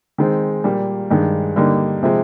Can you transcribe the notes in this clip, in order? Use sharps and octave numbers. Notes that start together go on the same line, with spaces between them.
D#3 G#3 C4
A#2 G3 A#3
G2 D#3 G#3
D3 G3 A#3 D#4
C3 F3 G#3